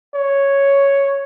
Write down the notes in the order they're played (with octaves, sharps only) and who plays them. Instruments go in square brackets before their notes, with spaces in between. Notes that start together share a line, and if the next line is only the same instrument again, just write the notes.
[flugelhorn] C#5